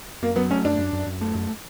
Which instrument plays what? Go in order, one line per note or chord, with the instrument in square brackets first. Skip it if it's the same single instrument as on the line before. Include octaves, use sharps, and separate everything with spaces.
[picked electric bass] F#2 [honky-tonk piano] A#3
[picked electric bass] F#3 [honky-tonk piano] B3
[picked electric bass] A3 [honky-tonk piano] C#4
[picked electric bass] F#2 [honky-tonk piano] D4
[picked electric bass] F#2
F#2
F#2
A3
F#2